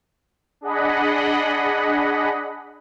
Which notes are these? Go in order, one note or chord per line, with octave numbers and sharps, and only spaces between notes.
D4 G#4 D#5 F#5 B5